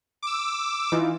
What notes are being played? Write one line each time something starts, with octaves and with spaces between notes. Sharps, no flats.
D6 E6
E3 D#4 F4